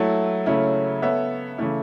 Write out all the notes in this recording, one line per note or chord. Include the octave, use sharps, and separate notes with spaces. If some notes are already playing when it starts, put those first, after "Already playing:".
Already playing: F#3 A3 E4
C#3 F#3 A3 C#4 E4
B3 A4 C#5 E5
C#3 E3 A3 E4